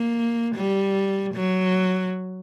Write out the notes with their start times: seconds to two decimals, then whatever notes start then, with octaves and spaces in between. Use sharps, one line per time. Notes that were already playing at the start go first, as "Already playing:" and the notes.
Already playing: A#3
0.55 G3
1.35 F#3